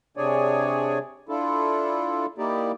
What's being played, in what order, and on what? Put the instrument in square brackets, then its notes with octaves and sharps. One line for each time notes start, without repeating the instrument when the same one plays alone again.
[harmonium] C3 D4 G#4 C#5 D5 G#5
D4 E4 F4 A4
A#3 D#4 E4 G4 D5